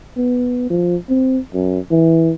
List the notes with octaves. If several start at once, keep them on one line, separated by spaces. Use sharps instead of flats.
B3
F3
C4
F#2
E3